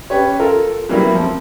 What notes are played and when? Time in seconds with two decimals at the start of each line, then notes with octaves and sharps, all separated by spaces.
0.10 C#4 G4 B4 C#5
0.40 F4 A4 A#4
0.89 F#3 G3 A#3 B3 E4
1.15 F3 C4